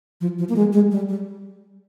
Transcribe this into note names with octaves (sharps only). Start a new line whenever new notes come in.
F3
F3
A#3
G#3
G#3
G3
G3